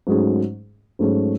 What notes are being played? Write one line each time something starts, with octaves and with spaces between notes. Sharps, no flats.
G#2 F#3 A3 C#4 G#4
G#2 F#3 A3 C#4 G#4